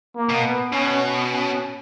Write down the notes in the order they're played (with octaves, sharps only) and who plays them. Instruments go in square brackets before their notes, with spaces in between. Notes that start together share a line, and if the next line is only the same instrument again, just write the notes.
[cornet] A#3
[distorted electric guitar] B2
[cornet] B3
[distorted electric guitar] B2 [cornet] C#4
[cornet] C#4